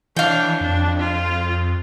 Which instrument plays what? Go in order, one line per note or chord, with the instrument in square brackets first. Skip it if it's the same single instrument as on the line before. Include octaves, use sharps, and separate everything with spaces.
[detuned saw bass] E3 [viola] D4 C#5 [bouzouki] F5 G5
[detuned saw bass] F2 [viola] D4
[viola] F4